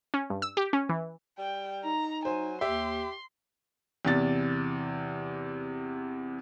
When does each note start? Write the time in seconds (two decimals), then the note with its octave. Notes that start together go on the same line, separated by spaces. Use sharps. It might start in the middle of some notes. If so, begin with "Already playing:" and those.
0.14 C#4
0.30 G2
0.42 E6
0.57 G4
0.73 C#4
0.89 E3
1.38 G3 G5
1.85 D#4 A#5
2.25 F#3 C5 G#5
2.61 D#2 G4 E5 C6
4.05 E2 C3 A6